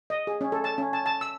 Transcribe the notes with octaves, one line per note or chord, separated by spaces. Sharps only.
D#5
G#4
C#4
A4
A5
C#4
A5
A5
E6